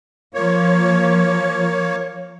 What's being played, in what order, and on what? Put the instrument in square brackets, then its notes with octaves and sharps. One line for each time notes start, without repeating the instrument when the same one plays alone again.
[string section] F3 [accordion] A#3 C#5